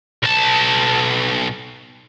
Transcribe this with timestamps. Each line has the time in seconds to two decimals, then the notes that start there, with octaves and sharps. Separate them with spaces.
0.23 B1 A5